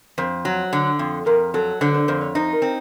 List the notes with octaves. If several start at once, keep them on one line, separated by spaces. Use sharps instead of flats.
F2 C5
F#3
D3
F2
F2 A#4
F#3 A4
D3 C5
C5
F2 C5
C#5
D#4 C5
A#4
C4